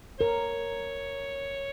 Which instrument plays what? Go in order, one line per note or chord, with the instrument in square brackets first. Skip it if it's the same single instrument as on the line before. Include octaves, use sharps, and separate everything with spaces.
[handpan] A#4 [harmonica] C#5